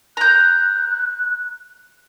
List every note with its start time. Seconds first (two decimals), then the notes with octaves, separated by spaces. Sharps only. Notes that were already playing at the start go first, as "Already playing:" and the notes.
0.17 A#5 F#6 G6